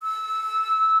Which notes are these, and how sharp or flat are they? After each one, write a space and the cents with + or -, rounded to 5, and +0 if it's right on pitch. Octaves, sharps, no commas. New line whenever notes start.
E6 -15